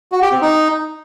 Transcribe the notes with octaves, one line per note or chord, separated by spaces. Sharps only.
F#4
G4
C4
D#4